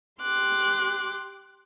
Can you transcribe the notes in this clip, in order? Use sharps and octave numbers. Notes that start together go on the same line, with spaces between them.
G4 C6 D6 F#6